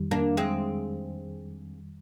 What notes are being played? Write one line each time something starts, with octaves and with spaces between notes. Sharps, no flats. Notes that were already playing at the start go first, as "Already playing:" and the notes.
Already playing: F2 D#3 G3
A#3 D4
G#3 C4